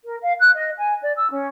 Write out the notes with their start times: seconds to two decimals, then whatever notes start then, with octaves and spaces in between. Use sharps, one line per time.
0.04 A#4
0.22 F5
0.40 F#6
0.55 D#5
0.78 G#5
1.02 D5
1.17 E6
1.31 C#4